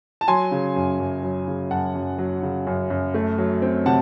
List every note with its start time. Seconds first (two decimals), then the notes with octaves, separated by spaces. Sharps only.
0.21 A5
0.27 F#3 G#5 C6
0.51 C#3
0.76 F#2
0.99 F#2
1.23 F#3
1.47 C#3
1.71 F#2 F#5 A5
1.95 F#2
2.18 F#3
2.42 C#3
2.67 F#2
2.90 F#2
3.14 A3
3.38 F#3
3.62 C4
3.86 C3 F#5 A5